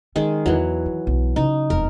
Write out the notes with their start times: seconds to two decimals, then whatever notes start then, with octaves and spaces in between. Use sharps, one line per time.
0.16 D#3 G#3 C#4
0.46 E2 E3 F#3
0.86 D#3
1.07 B1
1.36 C#3 D#4
1.70 E1 F2 A#4